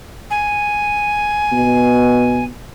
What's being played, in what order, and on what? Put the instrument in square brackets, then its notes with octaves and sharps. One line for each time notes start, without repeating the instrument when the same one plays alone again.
[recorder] G#5
[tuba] B2